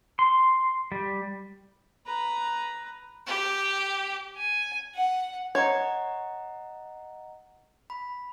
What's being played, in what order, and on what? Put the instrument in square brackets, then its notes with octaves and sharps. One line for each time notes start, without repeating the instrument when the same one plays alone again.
[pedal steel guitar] C6
G3
[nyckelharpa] B4 A#5
[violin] G4
[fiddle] G#5
F#5
[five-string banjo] C#5 [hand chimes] D#5 F#5 A#5
[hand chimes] B5